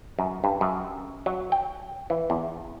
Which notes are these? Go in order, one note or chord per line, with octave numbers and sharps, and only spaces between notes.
F#2
G2
F#2
F#3
G5
E3
E2